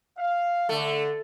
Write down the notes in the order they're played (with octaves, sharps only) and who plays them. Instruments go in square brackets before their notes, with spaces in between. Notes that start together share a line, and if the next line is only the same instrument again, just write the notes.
[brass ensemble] F5
[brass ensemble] D3 [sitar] A3